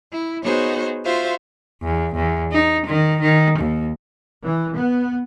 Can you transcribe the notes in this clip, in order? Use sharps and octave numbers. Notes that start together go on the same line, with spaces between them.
E4
B3 D#4 F#4 G#4 C5 C#5
F4 F#4 C5 E5 F5
E2
E2
D#4
D#3
D#3
D#2
E3
B3